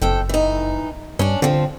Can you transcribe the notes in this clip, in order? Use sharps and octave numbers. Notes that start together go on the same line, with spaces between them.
F#1 F2 A4 G5
E3 D#4
G2 C#4 D4
D3 F3 C4